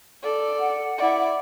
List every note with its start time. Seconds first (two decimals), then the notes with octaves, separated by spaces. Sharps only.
0.22 A4 D5
0.60 F#5
0.98 E4 D5